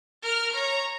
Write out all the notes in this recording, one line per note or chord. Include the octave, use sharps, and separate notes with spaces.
A#4 F6
C#5 A#5